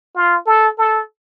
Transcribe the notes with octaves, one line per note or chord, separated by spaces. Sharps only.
F4
A4
A4